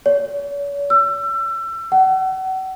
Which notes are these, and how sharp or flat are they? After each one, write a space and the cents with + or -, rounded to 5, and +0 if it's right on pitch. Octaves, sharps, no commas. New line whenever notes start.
C#5 +45
E6 +30
F#5 +35